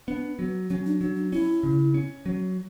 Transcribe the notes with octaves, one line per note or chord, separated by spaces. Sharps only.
B3 D4
F#3
F#3 C#4
D4
F#3 D4
D4
C#4 E4
C#3
C#4
F#3